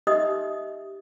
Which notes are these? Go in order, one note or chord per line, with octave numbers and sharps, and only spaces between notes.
D#4 G4 D#5 E5 D#6